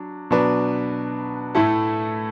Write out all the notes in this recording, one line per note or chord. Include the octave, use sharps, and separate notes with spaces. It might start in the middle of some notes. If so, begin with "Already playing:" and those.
Already playing: F#3 D4
B2 F#3 D4 B4
A2 A3 E4 A4